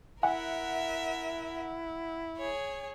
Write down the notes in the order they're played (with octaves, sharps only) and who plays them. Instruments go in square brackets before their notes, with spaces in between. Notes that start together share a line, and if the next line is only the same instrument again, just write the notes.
[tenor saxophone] E4 [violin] A#4 E5 [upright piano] F#5
[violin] G#4 C#5